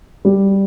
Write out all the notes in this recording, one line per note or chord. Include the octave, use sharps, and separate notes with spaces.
G3